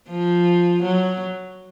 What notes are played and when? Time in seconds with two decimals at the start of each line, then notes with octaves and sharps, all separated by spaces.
0.09 F3
0.82 F#3